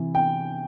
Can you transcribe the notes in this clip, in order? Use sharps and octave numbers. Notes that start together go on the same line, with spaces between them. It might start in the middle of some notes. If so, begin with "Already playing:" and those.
Already playing: C3 E3
G5